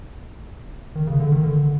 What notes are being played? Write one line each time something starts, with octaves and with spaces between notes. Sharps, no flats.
D#3
C#3
D3
D#3
D3